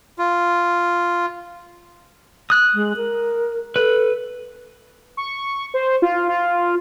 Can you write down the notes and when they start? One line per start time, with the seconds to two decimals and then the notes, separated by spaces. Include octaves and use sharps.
0.18 F4
2.50 D#6 F#6
2.74 G#3
2.96 A#4
3.76 A4 B4
5.17 C#6
5.74 C5
6.02 F4
6.29 F4